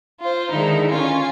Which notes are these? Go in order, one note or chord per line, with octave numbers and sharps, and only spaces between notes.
F4 C5
D3 D#3 G#3 D#4 E4
C#4 F4 G#5